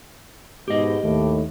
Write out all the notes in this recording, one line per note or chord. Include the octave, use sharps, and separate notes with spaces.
G#2 B2 G4 D#5
D#2 A2 A3